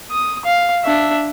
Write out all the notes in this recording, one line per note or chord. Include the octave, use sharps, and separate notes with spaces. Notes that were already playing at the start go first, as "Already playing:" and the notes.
D#6
F5
D4 E5